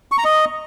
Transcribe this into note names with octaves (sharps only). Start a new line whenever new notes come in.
C#6
A#5
D#5